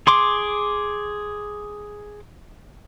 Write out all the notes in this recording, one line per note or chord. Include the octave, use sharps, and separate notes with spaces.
G#4 C6 D6